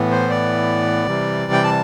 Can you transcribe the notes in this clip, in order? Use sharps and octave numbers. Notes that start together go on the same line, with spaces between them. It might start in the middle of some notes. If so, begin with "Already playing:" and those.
Already playing: A2 E3 B3
C5
D5
C3 E3 G3
G5
A5